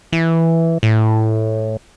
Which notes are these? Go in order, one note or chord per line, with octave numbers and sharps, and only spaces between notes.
E3
A2